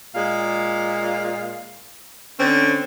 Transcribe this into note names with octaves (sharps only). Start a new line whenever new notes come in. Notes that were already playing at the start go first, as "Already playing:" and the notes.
A#2 G#3 F5
D3 C4 C#4